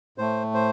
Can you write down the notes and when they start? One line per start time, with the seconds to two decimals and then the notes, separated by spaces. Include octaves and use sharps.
0.18 A2 A3 C5
0.55 C5